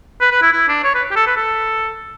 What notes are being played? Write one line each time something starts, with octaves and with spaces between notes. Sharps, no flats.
B4
B4
E4
E4
D4
C#5
B4
G4
A4
B4
A4